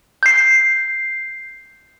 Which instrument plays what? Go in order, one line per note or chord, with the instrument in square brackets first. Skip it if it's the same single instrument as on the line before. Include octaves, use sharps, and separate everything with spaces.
[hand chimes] G6 C7